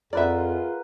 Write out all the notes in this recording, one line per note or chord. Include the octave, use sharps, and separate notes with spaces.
F2 F4 G#4 A#4 B4 D5 E5 F#5